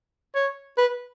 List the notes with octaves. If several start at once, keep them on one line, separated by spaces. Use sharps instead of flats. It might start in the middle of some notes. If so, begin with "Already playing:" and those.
C#5
B4